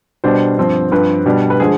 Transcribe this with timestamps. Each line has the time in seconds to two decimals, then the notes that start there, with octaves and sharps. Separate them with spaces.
0.24 B2 G3 D4 C5
0.58 G2 F3 C4
0.92 G2 F3 C4 B4
1.26 B2 G3 D4
1.50 B4
1.60 D3 F3 G#3 G#4